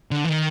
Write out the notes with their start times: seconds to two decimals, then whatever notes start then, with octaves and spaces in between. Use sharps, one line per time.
0.11 D3
0.25 E3
0.29 D#3